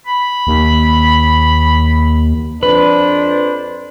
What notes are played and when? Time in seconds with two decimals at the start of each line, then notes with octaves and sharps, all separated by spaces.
0.07 B5
0.47 D#2
2.63 F2 D4 B4 C5